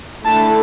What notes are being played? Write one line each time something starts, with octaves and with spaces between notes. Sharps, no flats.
D3 A3 E4 A5